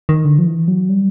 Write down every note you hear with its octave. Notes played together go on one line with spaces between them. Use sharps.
D#3
D3
F3
E3
F#3
G3